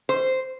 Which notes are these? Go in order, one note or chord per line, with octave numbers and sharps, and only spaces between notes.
C5